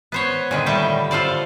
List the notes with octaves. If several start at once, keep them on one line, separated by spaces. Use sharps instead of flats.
B3 C5 C#5
A#2 D3 D#3
A2 G3 G5 A5
F4 A4 C5 D5